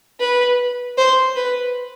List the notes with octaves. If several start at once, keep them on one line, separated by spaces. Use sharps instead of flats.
B4
C5
B4